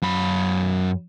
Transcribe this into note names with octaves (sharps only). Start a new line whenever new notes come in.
F#2 B5